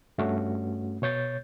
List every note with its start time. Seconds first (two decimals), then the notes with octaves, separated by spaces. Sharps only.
0.18 G2 A3 C#4 F#4
1.02 B2 C#5 G6 A6